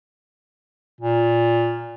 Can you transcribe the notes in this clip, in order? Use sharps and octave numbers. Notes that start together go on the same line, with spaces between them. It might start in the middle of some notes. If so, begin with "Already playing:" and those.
A#2